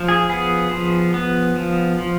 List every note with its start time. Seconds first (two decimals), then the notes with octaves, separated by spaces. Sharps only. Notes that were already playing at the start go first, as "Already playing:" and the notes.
Already playing: F3
0.08 G#4
0.29 B3 G#4
0.71 F3
1.14 B3
1.56 F3
1.98 F3